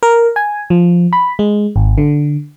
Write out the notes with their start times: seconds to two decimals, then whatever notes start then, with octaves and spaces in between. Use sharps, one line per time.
0.03 A#4
0.36 G#5
0.70 F3
1.13 B5
1.39 G#3
1.76 G#1
1.98 D3